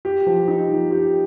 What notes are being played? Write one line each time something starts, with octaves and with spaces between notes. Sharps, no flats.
G4
F3
D#4
F3
G4